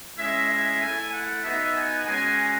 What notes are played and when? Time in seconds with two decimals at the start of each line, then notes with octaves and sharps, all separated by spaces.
0.17 G#3 C#4 E4 E5
0.49 E5
0.80 A3 E4 G#5
1.13 F#5
1.44 B3 D#4 F#4 E5
1.75 G#5
2.06 G#3 C#4 F#4 G#5